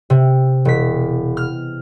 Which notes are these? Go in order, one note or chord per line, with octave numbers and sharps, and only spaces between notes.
C3
E1 B6
F6